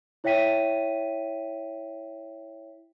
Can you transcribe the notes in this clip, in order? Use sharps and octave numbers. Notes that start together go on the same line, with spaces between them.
E4 C#5 E5 G5 B6 D#7